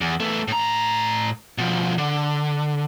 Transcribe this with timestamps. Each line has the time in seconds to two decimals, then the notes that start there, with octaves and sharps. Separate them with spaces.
0.01 E2
0.20 A3 B3
0.48 A2 A#5
1.58 B2 F3
1.98 D3